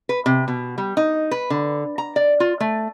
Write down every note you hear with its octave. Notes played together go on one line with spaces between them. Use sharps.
B4
C3
B2
G3
D#4
B4
D3
A#5
D5
F4
A3